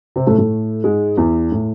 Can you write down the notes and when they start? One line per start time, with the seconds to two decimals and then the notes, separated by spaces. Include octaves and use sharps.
0.16 C3 C4
0.27 A2 A3
0.38 A2 A3
0.84 G#2 G#3
1.17 E2 E3
1.52 A2